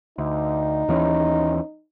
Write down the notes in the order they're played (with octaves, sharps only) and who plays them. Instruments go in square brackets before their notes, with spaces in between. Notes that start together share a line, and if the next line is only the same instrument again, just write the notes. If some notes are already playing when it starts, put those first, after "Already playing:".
[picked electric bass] D2 [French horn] D#4
[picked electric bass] D#2 E3 C#4